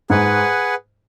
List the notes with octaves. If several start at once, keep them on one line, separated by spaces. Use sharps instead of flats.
G#2 G#4 B4 F#5